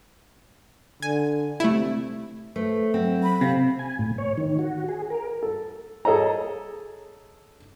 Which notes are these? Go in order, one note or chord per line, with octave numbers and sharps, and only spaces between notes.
D3 G#5
C3 A3 E4
A3 B4 C5
F#3 C4
B5
C3 C4 F5
G#5
A2
C#5
D#3
F#4
G#4
A#4
A4
G#4 A4 C#5 D#5 A#5